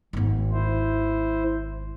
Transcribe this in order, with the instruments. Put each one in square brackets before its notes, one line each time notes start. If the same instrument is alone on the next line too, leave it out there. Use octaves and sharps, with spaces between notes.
[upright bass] G#1 B3
[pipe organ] E4 C5